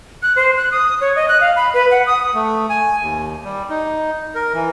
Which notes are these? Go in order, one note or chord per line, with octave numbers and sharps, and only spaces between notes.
F#6
C5
F#6
D#6
C#5
D#5
F#6
F5
B5
B4
F#5
D#6
A3
G#5
D#2
G3
D#4
A#4
E3